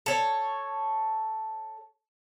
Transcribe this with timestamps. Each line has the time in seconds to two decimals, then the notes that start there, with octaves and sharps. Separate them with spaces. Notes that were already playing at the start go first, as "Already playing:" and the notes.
0.06 A4 C#5